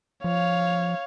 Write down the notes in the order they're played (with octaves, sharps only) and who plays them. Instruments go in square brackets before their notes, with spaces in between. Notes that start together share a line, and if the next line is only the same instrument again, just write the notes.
[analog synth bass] F3 [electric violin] C#5 F5